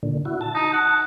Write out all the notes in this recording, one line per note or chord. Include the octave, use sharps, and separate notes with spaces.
A#2 D3
E4 F#4
A5
D#4
F#5